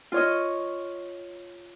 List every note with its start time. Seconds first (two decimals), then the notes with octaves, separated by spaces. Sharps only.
0.12 F4 C#5 D#5